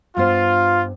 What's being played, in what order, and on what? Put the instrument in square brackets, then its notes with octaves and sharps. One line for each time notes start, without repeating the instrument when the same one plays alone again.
[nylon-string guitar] G2 B3 C5 [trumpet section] F4